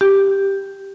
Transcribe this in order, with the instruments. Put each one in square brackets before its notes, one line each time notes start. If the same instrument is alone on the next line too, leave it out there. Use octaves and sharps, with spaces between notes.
[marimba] G4